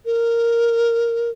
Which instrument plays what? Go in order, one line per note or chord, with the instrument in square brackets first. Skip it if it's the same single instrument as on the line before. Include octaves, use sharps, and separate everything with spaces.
[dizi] A#4